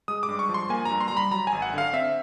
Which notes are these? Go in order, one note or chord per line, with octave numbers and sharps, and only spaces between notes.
G#3 D#6
D6
G2
C#6
F3
C6
A#3 G#5
G2 A#5
C6
A#5
G3
B5
F#3 A#5
G#5
G#1
F#5
D3 F5
C4 E5